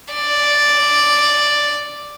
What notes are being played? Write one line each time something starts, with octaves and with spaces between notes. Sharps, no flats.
D5